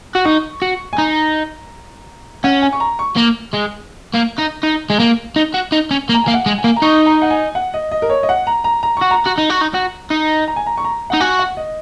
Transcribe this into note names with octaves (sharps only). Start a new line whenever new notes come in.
F#4
D#4 C#6
F#4
G#5
D#4 A#5
C#4 F#5
G#5
C#6
A#5
C#6
A#3
G#3
A#3
D#4
D#4
G#3
A#3
D#4
F#4
D#4
C#4
A#3
A#5
A#3 G#5
F#5
G#3
G#5
A#3
A#5
D#4 C#6
A#5
F#5
G#5
F#5
D#5
D#5
A#4
C#5
D#5
F#5
A#5
A#5
A#5
F#4 C#6
A#5
F#4
D#4
F#4
D#4
F#4
D#4
A#5
G#5
A#5
C#6
A#5
D#4 F#5
F#4 G#5
F#5
D#5